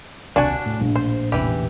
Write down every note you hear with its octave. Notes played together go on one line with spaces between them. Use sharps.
D#1 C2 C3 D4 F#4 G#5
A2
A#1
C5
A1 E2 C3 E3 G4